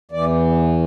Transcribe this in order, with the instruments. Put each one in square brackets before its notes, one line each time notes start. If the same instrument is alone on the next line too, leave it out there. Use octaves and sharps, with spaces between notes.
[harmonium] E2 E3 D5